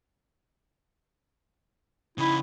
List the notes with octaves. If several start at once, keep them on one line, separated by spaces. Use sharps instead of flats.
C#3 D#4 E4